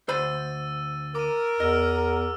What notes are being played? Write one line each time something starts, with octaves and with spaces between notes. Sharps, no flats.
D2 C5 B5 E6 A6 D#7
A#4 D6 D#7
E2 D#5 E6 F6